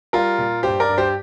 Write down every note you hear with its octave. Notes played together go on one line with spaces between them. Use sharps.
G3 F4 A#4
A#2
G2 G4 C5
A#4 D5
G2
G4 C5